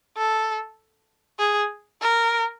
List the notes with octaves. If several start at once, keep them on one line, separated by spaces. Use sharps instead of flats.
A4
G#4
A#4